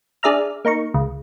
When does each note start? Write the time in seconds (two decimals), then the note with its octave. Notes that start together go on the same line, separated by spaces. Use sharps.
0.23 D4 G#4 D5 E5 A#5 F6
0.65 A#3 D#4 A#5 C#6
0.94 C#2